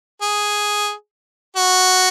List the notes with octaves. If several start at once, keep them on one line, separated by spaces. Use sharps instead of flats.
G#4
F#4